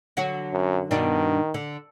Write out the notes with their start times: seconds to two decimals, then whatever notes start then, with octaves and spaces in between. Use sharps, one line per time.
0.17 D3 F#3 F#4
0.53 F#2
0.91 G2 B2 D#3 D4
1.54 D3